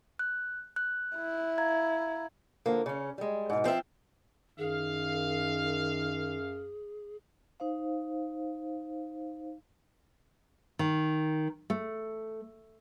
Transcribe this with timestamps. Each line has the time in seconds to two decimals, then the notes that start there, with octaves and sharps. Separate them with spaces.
0.19 F#6
0.76 F#6
1.16 E4
1.58 F5 A#5 G#6
2.66 D3 F3 A#3
2.86 C#3 C#4
3.18 G3 G#3
3.50 G#2 B2
3.64 F3 C4 A4 E5
4.58 F#2 D#3 G#4 F5
7.60 D#4 C5 F5
10.79 D#3
11.70 A3